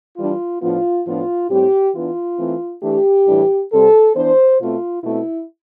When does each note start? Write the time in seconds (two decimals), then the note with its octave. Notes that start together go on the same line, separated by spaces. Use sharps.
0.17 E3 G3 D4 F4
0.61 A2 F3 B3 D4 F4
1.05 A2 F3 B3 D4 F4
1.49 A2 G3 C4 G4
1.94 E3 B3 D4 F4
2.39 E3 A3 C4
2.82 E3 A3 D4 G4
3.26 A2 E3 G3 D4
3.72 C3 G3 C4 A4
4.15 E3 B3 D4 C5
4.59 B2 A3 C4 F4
5.04 B2 A3 C4 E4